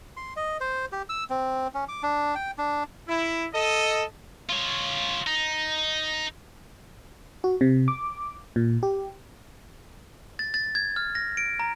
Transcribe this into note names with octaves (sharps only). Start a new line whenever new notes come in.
C6
D#5
C5
G4
E6
C4
C#4
D6
D4
G5
D4
E4
A4 D#5
F4 C#5
D#4
F#4
C3
D6
A#2
G4
A6
A6
G#6
F6
A#6
D7
A#5